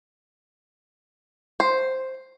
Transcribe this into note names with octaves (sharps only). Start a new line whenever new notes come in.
C5